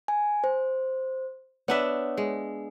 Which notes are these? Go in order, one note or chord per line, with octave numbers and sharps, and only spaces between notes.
G#5
C5
B3 D4 C#5 E5
G#3